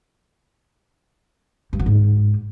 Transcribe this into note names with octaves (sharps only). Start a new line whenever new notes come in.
G2
F#3
G#2